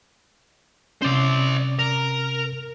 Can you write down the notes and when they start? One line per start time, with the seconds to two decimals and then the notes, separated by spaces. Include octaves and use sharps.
1.02 C3 C#4 C5 D5
1.79 A#4